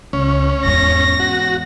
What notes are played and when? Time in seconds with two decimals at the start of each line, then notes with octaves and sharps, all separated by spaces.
0.13 C#2 C#4
0.65 E2 G#2 A#6
1.20 F#4